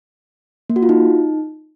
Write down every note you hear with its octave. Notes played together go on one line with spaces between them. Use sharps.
A#3
F#4
F4
D#4